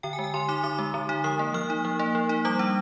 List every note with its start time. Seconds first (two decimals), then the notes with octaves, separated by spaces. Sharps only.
0.03 D3 G5
0.13 G#5
0.19 G#3
0.24 G#5
0.34 D3 C6
0.49 D#4 D6
0.64 D3 D6
0.79 G#3
0.94 D3
1.09 D#4
1.24 F3 D#6
1.39 A#3
1.54 F3 F6
1.70 D#4
1.85 F3
1.99 A#3
2.15 F3
2.29 D#4
2.45 G3 D6
2.59 D4